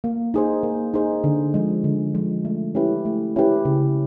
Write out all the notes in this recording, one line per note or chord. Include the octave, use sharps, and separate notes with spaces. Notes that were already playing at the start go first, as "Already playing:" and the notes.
A#3
D#4 G#4 C5
A#3
D#4 G#4 C5
D3
F3 G#3
D3
F3 G#3
A3
C#4 E4 G4 B4
A3
C#4 E4 G4 B4
C#3